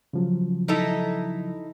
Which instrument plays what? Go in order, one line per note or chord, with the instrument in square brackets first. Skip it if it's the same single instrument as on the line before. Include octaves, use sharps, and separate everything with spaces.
[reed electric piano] C#3 F3 F#3
[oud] D#4 E4 A4